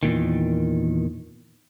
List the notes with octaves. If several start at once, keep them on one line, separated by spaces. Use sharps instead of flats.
E2 G2 A#2 D#3